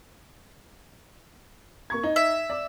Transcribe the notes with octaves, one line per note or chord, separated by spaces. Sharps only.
A#3 C#6 G#6
D#4
E5
D5